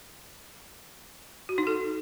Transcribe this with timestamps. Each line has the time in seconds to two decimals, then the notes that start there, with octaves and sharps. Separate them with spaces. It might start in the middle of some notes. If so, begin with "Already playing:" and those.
1.49 F#4
1.58 D#4
1.67 A4